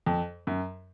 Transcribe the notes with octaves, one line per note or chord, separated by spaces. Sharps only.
F2
F#2